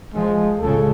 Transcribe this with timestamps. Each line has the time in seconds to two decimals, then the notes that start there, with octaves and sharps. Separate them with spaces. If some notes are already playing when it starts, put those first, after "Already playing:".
0.14 F3 G#3
0.60 C#2 A2 C#3 A4